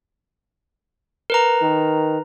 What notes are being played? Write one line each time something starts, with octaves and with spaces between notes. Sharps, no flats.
A#4 B4 A#5
D#3